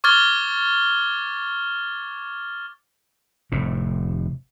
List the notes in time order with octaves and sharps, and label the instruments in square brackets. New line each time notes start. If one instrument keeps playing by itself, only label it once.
[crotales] C#6 D6 F6 G#6 A6 G7
[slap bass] F1 A2 C3